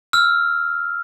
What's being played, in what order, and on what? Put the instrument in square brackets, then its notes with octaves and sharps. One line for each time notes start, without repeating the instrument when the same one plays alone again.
[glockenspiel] E6 F6